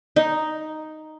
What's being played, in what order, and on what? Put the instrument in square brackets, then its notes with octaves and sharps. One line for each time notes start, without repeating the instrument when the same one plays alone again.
[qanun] D#4